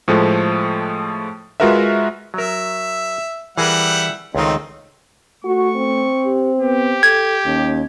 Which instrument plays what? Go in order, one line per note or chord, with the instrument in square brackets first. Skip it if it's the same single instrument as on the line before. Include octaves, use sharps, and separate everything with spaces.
[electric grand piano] A2 F3 G#3 A3
G#3 F4 F#4 A#4 B4 E5
[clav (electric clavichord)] F#3 A#4 [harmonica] E5
[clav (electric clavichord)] E3 G#4 A#4 [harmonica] G3 E5 F#5
[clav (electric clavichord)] C#2 D#3 [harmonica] A3 C4 D#4
[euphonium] A3 [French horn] F#4 [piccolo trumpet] C#6
[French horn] C4
[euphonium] G4
[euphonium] B3 [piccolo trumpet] G4
[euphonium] A4 [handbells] G#6
[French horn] D#2 [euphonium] C#4